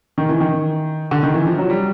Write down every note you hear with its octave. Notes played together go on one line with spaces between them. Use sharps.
D#3
E3
D#3
D3
D#3
E3
F3
F#3
G3